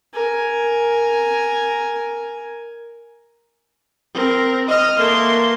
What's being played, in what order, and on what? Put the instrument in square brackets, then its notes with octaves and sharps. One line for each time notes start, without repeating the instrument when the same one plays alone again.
[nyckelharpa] A#4 G#5
[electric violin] C4 A#4
[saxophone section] D#5 [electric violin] D#6 F6
[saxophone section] E3 A3 A#3 [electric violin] A#4 C6